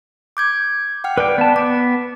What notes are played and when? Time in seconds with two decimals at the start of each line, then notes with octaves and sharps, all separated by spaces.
0.37 D6 G6 G#6
1.04 F#5 G5 F6
1.18 B4 D5 G5 D6
1.38 B3 A5
1.56 B3 D6